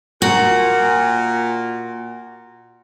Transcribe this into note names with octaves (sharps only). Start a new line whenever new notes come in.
A#2 F#4